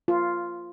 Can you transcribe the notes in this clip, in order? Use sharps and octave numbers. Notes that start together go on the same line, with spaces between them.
F4